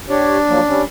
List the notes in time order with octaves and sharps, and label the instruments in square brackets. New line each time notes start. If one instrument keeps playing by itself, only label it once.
[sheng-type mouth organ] D4 [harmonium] G4 C#5
[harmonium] F3 F#3 A#3
G3 C#4